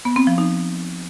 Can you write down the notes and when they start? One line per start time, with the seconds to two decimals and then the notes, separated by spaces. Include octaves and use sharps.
0.05 B3
0.16 C4
0.27 F3
0.38 D#4